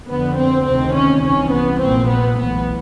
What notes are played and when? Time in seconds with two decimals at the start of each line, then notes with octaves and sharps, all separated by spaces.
0.08 F2 D3 B3
0.38 C4
0.66 D2 C3 D#3 C4
0.94 C#4
1.23 C2 C3 E3 C#4
1.51 B3
1.81 A#1 A#2 C4
2.09 B3
2.38 B1 A2 E3 B3